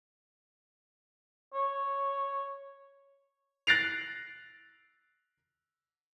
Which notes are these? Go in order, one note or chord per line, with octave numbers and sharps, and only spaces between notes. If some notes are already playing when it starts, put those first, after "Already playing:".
C#5
F#6 A6 A#6 C7 D7 F7